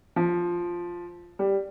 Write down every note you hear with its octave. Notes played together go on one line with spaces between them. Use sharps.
F3
G3